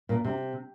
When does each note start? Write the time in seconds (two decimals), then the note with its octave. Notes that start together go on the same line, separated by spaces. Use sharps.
0.09 A#2
0.24 C3